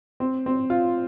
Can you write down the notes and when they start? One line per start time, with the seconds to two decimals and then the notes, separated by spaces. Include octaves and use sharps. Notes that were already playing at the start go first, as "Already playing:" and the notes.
0.20 C4
0.46 C4
0.70 F4